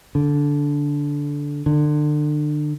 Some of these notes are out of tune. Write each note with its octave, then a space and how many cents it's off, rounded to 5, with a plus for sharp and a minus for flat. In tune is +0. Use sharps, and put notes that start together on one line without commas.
D3 -15
D3 +30